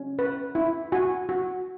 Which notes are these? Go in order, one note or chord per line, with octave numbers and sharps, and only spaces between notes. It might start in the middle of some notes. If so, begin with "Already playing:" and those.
Already playing: C#4
B4
E4
F#4 G#5
F#4